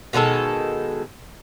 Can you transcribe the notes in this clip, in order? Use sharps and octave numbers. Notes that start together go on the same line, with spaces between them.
B2 D#3 G#3 A4